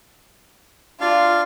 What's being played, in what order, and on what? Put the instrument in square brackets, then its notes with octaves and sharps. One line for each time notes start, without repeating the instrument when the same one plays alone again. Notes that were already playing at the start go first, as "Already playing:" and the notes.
[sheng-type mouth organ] D4 F5 [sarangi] F4